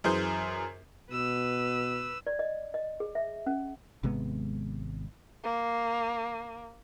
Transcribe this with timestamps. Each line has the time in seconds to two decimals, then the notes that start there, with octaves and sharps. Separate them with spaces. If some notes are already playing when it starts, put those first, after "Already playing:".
0.04 F#2 E3 G#4 C5 G6
1.12 B2 B4 E6
2.27 D5
2.39 D#5
2.74 D#5
3.00 G#4
3.15 E5
3.46 C#4
4.03 G#1 C3 G#3 B3
5.44 A#3